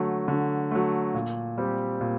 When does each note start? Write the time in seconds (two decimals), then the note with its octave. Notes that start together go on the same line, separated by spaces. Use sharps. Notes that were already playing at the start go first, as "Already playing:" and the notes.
Already playing: D3 F#3 A3
0.28 D3
0.71 F#3 A3
1.14 A#2
1.58 G3 C4 G4
2.01 A#2